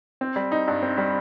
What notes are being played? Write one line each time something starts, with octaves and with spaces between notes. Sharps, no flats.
C4
G3
D#4
G2
C4
G3